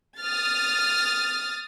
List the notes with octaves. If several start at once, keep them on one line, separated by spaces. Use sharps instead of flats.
D#6 F6 A6